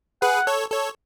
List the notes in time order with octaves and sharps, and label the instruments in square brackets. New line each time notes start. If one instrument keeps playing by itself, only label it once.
[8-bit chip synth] G#4 B4 [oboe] F#5
[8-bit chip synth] A4 C#5
A4 C#5